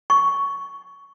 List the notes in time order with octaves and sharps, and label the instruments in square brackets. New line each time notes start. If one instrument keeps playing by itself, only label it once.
[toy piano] C#6